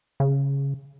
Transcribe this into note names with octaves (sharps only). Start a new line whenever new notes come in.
C#3